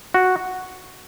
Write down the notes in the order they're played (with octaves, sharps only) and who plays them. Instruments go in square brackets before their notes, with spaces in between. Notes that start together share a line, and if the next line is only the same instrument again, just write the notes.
[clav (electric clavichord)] F#4